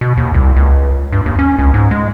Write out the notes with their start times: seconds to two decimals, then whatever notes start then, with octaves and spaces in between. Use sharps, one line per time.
0.01 B2
0.17 D#2
0.34 C2
0.56 C#2
1.12 G2
1.26 D#2
1.39 C#4
1.58 C#2
1.74 G#2
1.91 G#3